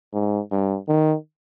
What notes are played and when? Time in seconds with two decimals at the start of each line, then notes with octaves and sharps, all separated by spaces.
0.13 G#2
0.51 G2
0.88 D#3